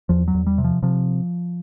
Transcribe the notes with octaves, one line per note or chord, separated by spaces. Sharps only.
E2 F3
F#3
E2
G3
C3
F3
C3 F3